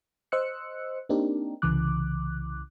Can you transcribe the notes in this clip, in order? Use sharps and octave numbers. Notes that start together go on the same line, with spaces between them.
C5 D#5 E6 F#6 C#7
A#3 C4 D4 D#4 G4 A#4
C2 C#3 E3 D6 F#6